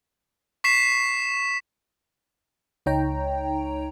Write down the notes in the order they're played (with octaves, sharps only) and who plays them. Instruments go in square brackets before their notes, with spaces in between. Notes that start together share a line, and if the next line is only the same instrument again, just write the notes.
[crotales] C#6 B6 C7 E7
[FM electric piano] C#2 D#4 C#5 G5 A#5